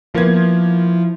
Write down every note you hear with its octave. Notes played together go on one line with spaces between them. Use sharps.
F3 A#3 B3 E4 G#6